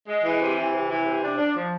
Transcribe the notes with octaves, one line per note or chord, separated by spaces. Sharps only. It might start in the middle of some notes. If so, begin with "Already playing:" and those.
G#3
E3
C3
E3
C3
E3
C3
D4
D4
F3